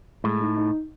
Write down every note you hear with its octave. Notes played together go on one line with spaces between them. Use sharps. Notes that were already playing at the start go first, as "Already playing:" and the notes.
A2 G#3
D#4
D#4